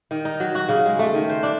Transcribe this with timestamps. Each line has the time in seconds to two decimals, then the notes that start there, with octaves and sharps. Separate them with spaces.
0.11 D#3
0.25 D#4
0.40 F#3
0.55 F#4
0.69 C#3
0.86 G#3
0.99 A3
1.14 D#3
1.29 C5
1.43 D4